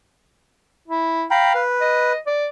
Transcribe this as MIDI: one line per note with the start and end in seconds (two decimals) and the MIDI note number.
0.88 1.24 64
1.31 1.61 77
1.31 1.53 79
1.31 1.53 82
1.31 1.53 83
1.54 2.13 71
1.81 2.18 75
2.26 2.47 74